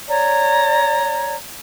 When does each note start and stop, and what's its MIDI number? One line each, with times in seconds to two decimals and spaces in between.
0.08 1.34 73
0.08 1.34 74
0.08 1.34 82